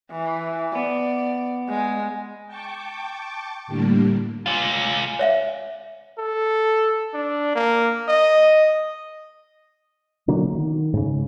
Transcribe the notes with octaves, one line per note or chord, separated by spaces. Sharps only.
E3
B3 D5
G#3
G5 A5 C#6 D6
A2 D3 G3 A#3 D4
G#3 F4
C#5 E5 F5
A4
D4
A#3
D#5
B2 D3 F#3 A#3
D#3
G#2 C#3